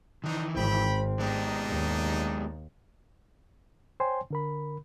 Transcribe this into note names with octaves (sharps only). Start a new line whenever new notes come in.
D#3 E3 C4 D4 D#4
G#1 C4 G5 B5
G#3 B3 D4 D#4 G4
D#2
C5 C#5 G5 G#5 C6
D3 A#4 B5